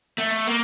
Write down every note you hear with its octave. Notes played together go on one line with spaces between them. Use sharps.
A3
A#3